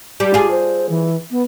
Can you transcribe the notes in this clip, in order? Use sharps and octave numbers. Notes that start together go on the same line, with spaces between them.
G3
F4 G4 G#4
C5
E3
B3